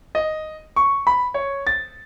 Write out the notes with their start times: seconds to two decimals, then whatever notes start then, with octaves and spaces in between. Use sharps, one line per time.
0.15 D#5
0.76 C#6
1.07 B5
1.34 C#5
1.67 A6